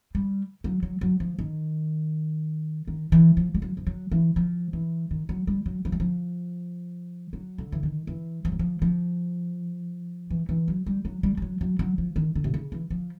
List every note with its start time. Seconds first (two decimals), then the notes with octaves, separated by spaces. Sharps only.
0.15 G3
0.64 F#3
0.83 F#3
1.01 F#3
1.20 F3
1.39 D#3
2.88 D#3
3.12 E3
3.37 F3
3.55 G3
3.62 F#3
3.77 F3
3.87 F#3
4.11 E3
4.36 F3
4.73 E3
5.11 D#3
5.29 F#3
5.47 G3
5.66 F#3
5.85 F3
5.92 F#3
6.00 F3
7.33 F#3
7.58 D3
7.72 E3
7.83 D#3
8.07 E3
8.45 F3
8.52 F#3
8.59 F3
8.82 F3
10.30 E3
10.49 E3
10.68 F#3
10.86 G3
11.05 F#3
11.23 G3
11.37 G3
11.42 F#3
11.61 F#3
11.79 F#3
11.98 F3
12.16 D#3
12.35 D3
12.44 C3
12.54 C#3
12.72 E3
12.90 F3